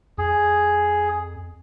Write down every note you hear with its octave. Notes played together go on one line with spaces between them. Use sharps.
F2 G#4